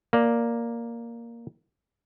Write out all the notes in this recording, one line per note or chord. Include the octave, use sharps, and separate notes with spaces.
A#3 D5